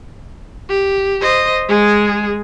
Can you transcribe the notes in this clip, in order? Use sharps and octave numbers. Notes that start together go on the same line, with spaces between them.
G4
C5 D#5
G#3 G#4